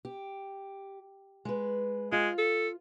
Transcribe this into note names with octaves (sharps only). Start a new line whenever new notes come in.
G4
G#3 B4
G#3 F4
A4